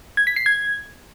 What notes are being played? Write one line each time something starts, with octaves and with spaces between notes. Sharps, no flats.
G#6
B6
C7
G#6